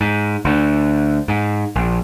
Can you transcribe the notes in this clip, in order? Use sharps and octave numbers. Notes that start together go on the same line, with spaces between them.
G#2
D2
G#2
A#1